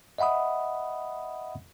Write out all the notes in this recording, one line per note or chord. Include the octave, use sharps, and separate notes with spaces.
D#5 E5 F#5 B5 D#6